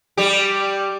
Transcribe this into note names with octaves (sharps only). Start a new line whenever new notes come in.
G3 G4